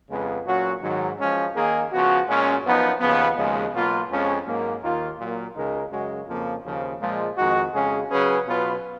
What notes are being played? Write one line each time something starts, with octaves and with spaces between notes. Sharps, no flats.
F2 C#3 G#3 B3
A#2 F#3 C#4 F#4
G#2 D#3 F#3
F3 G#3 C#4
D#3 A#3 D#4 G#4
C#3 F3 B3 F#4
A#2 G#3 C#4
F#2 F3 B3 D#4
D#2 C#3 F3 B3
D#2 C#3 F3 G#3
B2 F#3 A#3 F4 B4
F2 F3 G#3 C#4
G#2 F#3 A#3
D#2 D#3 A#3 F4
A#2 F#3 A#3
C#2 C#3 G#3 D#4 A#4
F#2 C#3 G#3 C#4 F#4
F2 C#3 F3 A#3
D#2 C#3 F3
A#2 F3 G#3
F2 D#3 G#3 D#4 F#4
F2 C#3 G#3 C#4 G#4
C#3 F#3 C#4 G#4 B4
B2 F#3 B3 F4 B4